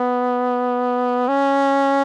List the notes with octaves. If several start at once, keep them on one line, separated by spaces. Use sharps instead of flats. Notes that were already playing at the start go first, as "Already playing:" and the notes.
Already playing: B3
C#4